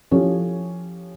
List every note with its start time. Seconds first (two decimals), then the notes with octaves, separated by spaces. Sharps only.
0.11 F3 C#4 E4 G4 A4 C#5